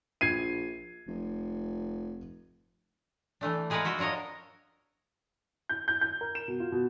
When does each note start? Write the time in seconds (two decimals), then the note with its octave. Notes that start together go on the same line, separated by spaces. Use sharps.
0.21 A#1 G#6 C7 D#7
1.07 F1
3.41 E3 A3 D4
3.70 G#3 G#4 A#4 B4 F5 F#5
3.85 F4 F#4 E5 F#5
3.99 D4 F4 A#4 C#5 D#5
5.69 G6
5.88 G6
6.01 G6
6.21 A#4
6.35 E7
6.48 B2
6.60 F4
6.72 B2